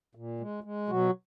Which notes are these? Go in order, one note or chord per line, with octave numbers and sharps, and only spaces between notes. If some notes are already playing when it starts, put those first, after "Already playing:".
A#2
G#3
G#3
B2 F#3 F#4